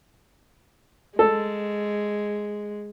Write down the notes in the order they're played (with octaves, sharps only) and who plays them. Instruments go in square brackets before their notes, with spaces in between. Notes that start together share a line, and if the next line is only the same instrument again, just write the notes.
[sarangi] G#3 [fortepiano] A4